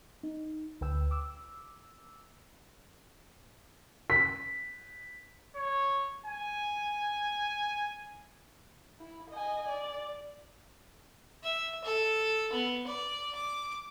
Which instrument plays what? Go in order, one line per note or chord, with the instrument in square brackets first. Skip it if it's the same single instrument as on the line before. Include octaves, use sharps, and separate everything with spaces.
[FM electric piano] D#4
D2 B4 G5 E6
D6 E6
[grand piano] B6
[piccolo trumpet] C#5
G#5
[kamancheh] E4
D#5 G#5
D5
[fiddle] E5
A4
B3
D5
D6